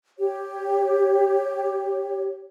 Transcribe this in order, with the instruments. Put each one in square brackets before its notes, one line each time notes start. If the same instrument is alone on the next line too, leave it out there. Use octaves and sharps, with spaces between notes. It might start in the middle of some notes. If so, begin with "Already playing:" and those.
[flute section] G4 C#5